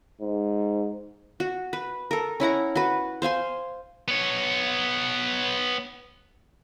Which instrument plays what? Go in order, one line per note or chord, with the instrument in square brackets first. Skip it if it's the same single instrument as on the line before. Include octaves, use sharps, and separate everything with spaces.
[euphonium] G#2
[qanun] F#4
B4
A4 A#4
C#4 E4 F#5 A#5
F#4 B4
C5 F5 G#5 C6
[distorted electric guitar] B3 C#5